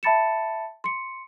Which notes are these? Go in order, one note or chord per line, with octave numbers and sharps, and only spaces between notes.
E5 A5 B5 A6 C#7 E7
C6 C#7